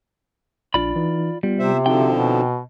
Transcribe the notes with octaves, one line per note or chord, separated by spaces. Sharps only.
A#1 D4 F4 D5 B5
E3 D#4
G3 B3 F4
C3 C5 E5
D3 F3 C4 D#4 F#4 G5
B2